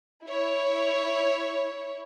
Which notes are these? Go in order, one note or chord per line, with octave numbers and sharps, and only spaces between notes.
E4 C#5